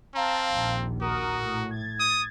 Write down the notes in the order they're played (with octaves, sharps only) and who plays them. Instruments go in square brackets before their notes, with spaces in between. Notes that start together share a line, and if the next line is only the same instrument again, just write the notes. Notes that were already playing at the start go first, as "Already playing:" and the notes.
[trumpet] C4 [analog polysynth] F5 A5 A#5
[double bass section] A#1 D#2
[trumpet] F#4 [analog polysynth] A#4 D#6
[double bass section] A2
[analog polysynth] G#6 A6
[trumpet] D#6